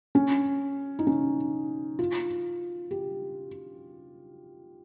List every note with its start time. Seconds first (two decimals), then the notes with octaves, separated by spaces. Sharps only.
0.15 C#4
0.99 D#4
1.07 C#4
1.99 F4
2.91 G4